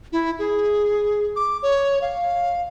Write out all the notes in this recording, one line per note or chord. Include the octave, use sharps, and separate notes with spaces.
E4
G#4
D6
C#5
F5